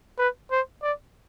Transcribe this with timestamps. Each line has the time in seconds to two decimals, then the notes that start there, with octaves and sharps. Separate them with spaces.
0.19 B4
0.51 C5
0.83 D5